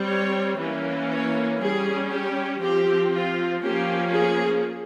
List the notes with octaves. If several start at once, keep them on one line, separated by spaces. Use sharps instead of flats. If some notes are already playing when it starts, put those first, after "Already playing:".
Already playing: G3 C4
C#5
E3 A#3 C#4
C#5
G3 C#4 G#4
G4
F3 C4 G4
F4
F3 A#3 C#4 G4
G#4